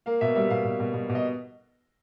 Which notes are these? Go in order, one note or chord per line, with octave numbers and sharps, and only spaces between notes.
A#3 F5
B2 E5
G3 E5
B2 F5
B2
B2
B2
B2
D#5